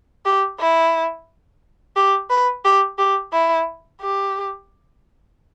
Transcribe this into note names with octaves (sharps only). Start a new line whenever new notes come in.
G4
E4
G4
B4
G4
G4
E4
G4